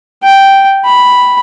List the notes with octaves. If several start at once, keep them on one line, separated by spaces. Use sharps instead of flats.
G5
B5